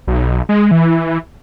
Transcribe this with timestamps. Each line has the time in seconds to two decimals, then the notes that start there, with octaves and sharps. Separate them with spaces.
0.08 B1
0.49 G#3
0.71 E3